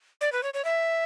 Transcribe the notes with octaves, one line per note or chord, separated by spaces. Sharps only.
D5
B4
C#5
C#5
E5